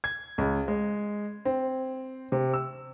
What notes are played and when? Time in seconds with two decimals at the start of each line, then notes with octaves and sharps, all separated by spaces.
0.04 G#6
0.38 C#2
0.68 G#3
1.45 C4
2.32 C3
2.54 E6